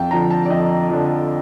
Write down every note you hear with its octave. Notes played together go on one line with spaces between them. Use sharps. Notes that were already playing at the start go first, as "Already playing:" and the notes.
Already playing: F2 F5 G5 A5
D3 F3 A#5
A5
D5
F2 D#5
D3 F3